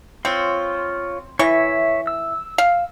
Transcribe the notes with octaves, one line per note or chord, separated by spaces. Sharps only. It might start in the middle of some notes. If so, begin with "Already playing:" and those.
C4 F4 C#5 C6
E3 C#5 E5 C#6
E6
F5